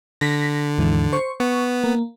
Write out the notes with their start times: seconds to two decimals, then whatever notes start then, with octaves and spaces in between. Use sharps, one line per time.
0.21 D3 A#6 B6
0.78 D#2 G#2 E3
1.13 C5 C#6
1.40 B3 C#6
1.84 A#3